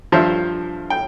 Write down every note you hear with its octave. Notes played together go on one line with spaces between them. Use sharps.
G2 F3 C5 E5
G5